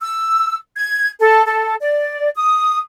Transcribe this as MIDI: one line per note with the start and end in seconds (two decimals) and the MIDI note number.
0.02 0.54 88
0.77 1.08 92
1.19 1.43 69
1.46 1.75 69
1.80 2.29 74
2.36 2.78 87